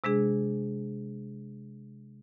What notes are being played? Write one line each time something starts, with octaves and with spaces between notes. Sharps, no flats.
C3 G#3 D4 G#4